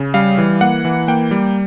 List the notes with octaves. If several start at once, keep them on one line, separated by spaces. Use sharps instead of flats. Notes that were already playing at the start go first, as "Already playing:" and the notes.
Already playing: C#3
G3 F5
E3
A#3 F#5
E3
A#3 G5
G3